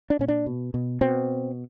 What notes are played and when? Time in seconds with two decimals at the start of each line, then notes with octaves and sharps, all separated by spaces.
0.10 D4
0.19 A#2 C#4
0.28 D4
0.46 B2
0.74 B2
1.01 B2 C4